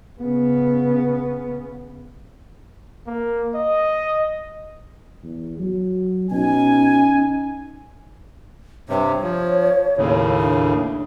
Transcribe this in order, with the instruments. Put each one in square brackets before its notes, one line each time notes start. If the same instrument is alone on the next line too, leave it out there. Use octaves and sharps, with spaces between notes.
[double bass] C#3 B3
[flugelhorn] A#3
D#5
[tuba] E2
F#3
[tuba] B2 [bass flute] C#4 [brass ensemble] D#4 G#5
[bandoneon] G2 C3 [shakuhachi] C#5
[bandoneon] F3
D#2 A2 C#3
[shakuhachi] D4